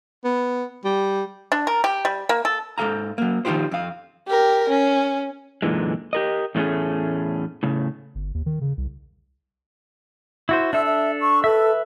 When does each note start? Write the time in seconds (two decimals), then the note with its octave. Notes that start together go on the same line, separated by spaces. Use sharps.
0.24 B3
0.85 G3
1.52 D4
1.67 A#4
1.84 G4
2.05 G3
2.29 A#3
2.45 A4
2.78 G#2 F3 A4 F5 A#5
3.18 F#3 A#3
3.45 D#3 F3 D#4 F4 G4 C5
3.71 F2 F5
4.28 G4 A#4
4.69 C#4
5.62 F#2 A#2 D3 E3 G#3
6.13 G4 A#4 D#5
6.55 E2 A2 A3 C#4 G#4
7.63 A2 C#3
8.15 G1
8.34 D#2
8.46 D#3
8.61 C#3
8.77 C2
10.49 E4 F#4 C5
10.73 D4 A4 E5 E6
10.86 E5
11.21 C#6
11.44 A4 B4 E5